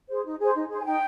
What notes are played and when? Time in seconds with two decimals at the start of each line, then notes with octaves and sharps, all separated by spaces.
0.09 G#4 C5
0.25 D#4
0.39 G#4 C5
0.55 D#4
0.70 G#4 C5
0.80 G#5
0.86 D#4 G5